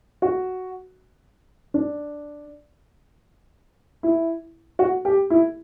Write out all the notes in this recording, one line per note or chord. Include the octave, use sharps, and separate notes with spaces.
F#4
D4
E4
F#4
G4
E4